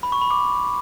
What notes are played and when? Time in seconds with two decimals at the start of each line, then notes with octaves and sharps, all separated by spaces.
0.03 B5
0.12 C#6
0.21 B5
0.31 D6